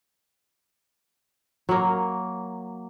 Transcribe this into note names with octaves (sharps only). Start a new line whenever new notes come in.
F#3 A#3